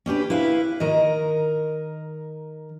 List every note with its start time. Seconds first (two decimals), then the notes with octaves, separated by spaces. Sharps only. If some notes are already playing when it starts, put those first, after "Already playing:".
0.06 C#4 D4 G4 B4
0.30 E4 B4 F5
0.80 D#3 A#4 D#5